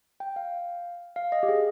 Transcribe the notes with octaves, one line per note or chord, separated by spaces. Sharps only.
G5
F5
F5
D#5
G4
G#4